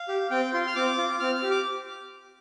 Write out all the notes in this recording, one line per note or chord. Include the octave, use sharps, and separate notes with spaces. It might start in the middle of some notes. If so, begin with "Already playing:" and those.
Already playing: F5
G4
C4 G5
F4 C6
F6
C4 D6
F4
C4 F6
F6
G4
D6